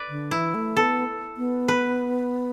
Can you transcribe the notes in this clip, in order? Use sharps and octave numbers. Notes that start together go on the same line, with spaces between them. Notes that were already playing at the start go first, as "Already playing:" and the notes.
Already playing: B4 D5
D3
E3 E4
A3
B3 A4
B3
B4